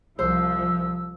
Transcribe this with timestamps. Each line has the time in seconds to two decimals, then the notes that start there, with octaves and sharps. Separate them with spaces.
0.19 C2 F3 C5 E6